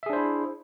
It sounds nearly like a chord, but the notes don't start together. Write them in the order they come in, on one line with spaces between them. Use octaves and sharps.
E5 G#4 D4 C5 E4